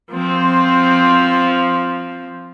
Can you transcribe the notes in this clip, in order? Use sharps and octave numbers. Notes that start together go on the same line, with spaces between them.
F3 C4